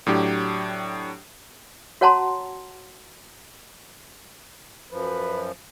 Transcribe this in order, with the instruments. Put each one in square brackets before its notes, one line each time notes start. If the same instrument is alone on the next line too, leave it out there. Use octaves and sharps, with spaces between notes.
[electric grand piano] A2 F#3 D4 G4
[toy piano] F#4 C#5 F#5 A5 A#5 C6
[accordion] F#2 F3 [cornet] B4